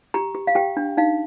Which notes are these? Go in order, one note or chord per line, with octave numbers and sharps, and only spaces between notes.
G4 A#5
G4
F5
G4 G5
D4
D#4 F5